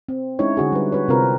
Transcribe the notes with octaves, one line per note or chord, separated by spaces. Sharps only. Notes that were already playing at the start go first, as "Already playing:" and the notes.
C4
G#3 C#4 D#4 E4 C#5
D3 F#4 G#4
G3 B4
F#4 B4 C#5
C3 C4 F4 A#4 B4